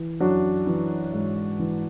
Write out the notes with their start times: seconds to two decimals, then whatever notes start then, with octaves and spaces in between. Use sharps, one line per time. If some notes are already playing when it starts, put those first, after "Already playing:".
Already playing: E3
0.20 F#2 D4 F#4
0.67 E3
1.13 G#2
1.59 E3